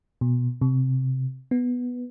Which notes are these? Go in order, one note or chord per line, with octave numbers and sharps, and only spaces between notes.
B2
C3
B3